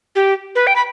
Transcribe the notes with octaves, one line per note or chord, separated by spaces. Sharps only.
G4
B4
G5
B5